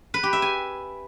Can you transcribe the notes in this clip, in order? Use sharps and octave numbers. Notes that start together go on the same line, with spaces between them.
B4
G4
E5
G#5